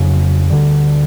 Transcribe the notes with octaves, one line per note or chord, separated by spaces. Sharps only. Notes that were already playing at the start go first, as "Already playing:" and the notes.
Already playing: F2 C#3 F#3 A#3
D2 D3 G3